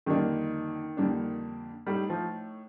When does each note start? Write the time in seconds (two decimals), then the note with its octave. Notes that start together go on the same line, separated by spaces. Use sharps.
0.06 F2 D3 D#3 G3 A#3 D4
0.97 F2 D3 G3 A#3 D4
1.87 A2 G3 A3 D#4
2.10 F3